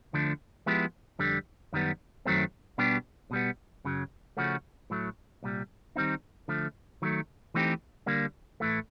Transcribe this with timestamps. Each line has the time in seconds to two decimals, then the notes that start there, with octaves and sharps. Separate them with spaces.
0.13 D2 D3 F3 A3 D4
0.66 F3 G#3 B3 E4 G4
1.19 F2 D3 G3
1.73 F#2 D#3 G3 B3
2.26 F#2 D#3 F#3 A3 C4
2.78 B2 G3 B3 D4 G4
3.31 B2 G3 B3
3.85 F#2 C#3 F#3
4.37 C#3 F3 A3 C#4 F#4
4.90 A2 F#3 A3
5.43 C2 A#2 G3
5.96 D#3 G3 C4 D#4
6.48 D3 F3 A3
7.02 D#3 F#3 A3
7.54 E3 A3 C4 D#4 G4
8.06 D3 G3 A#3 D4
8.60 A2 E3 A3